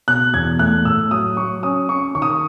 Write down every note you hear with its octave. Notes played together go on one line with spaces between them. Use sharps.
B2 F#6
E2 G#6
A3 F#6
A2 E6
F#3 D#6
F#3 C#6
C#4 D#6
C#4 C#6
D#3 C#6
D#6
C#6